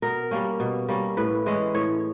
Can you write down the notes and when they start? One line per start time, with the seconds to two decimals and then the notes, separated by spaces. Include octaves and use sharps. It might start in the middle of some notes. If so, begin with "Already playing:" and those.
0.02 B2 A#4
0.31 G3 A#3 C#4
0.60 B2
0.88 G3 A#3 C#4
1.17 A2 B4
1.46 E3 G#3 C#4
1.75 A2 C#5